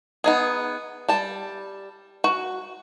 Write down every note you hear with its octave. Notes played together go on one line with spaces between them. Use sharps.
B3 D#4 G#4
G3 A5
F#4